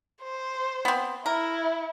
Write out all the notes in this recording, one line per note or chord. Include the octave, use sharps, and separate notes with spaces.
C5
B3 C4
E4 A#4